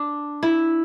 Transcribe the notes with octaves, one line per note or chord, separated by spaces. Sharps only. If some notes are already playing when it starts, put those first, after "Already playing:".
Already playing: D4
E4